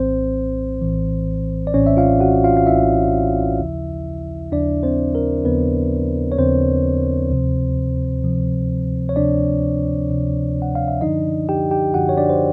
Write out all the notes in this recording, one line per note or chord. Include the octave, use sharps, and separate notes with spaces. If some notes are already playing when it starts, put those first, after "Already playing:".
Already playing: A#1 A2 E3 C4 C5
A#1 A2 E3
D5
A#1 A2 E3 C#4 C#5
E5
F4 F5
F#4 F#5
F4 F5
F5
A#1 A2 E3 E4 E5
D#2 C#3 F3
D#2 C#3 F3 D4 D5
C4 C5
A#4
D#2 C#3 F3 B3 B4
C#5
D#2 C#3 F3 C4 C5
D2 C3 F3
D2 C3 F3
C#5
D2 C3 F3 D4 D5
D2 C3 F3
F#5
F5
E5
F#2 D3 F3 D#4 D#5
G4 G5
G4 G5
F#2 D3 F3 F#4 F#5
C#5
D4 D5
C5